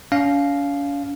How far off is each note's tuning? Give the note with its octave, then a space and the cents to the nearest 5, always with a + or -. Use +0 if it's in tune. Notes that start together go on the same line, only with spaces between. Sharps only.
C#4 +45 F5 +0